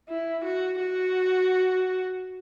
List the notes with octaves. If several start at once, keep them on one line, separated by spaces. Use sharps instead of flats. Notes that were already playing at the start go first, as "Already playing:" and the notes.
E4
F#4
F#4